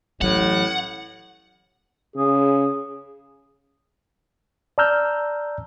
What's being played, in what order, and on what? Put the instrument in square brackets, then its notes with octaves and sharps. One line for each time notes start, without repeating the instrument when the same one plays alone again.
[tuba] A1 [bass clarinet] A2 [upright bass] E3 F#3 [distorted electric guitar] F#5
[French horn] C#3 [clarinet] G#4
[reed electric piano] D5 A5 A#5 E6 F6 G6